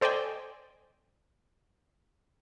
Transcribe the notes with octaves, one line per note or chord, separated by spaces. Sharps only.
A4 C5 D5 D#5 G5 G#5